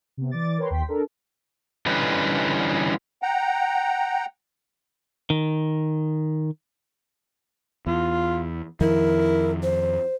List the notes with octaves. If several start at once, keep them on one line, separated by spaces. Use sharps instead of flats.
C3 B3
E3 D5 D6 A6
A#4 B4 C#5 G5 A#5 C6
D#2 G5 C6 B6
D4 A4 A#4
D3 E3 G3 C#4 D#4 B4
F#5 G5 A#5
D#3
E2 F4
F2 D#3 F3 E4 A#4
C5